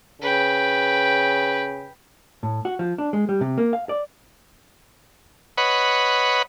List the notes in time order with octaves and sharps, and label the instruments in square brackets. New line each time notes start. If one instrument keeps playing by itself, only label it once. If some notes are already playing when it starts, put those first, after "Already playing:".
[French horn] C#3 [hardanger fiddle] B4 G5
[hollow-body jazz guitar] A2
F#4
F3
D4
G#3
G3
C3
A#3
F5
D5
[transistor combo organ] B4 C#5 D#5 F#5 B5